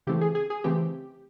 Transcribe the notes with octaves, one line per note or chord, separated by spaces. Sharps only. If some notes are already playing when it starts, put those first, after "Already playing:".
C#3 E3 A3 C4 G4
G#4
G#4
G#4
C#3 E3 A3 C4 G4